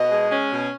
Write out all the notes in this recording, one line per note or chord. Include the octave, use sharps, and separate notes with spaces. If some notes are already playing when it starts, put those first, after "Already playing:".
Already playing: B2 D#5
G#3
C#4
B2